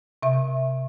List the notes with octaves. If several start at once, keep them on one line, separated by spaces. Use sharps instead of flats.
C3 E5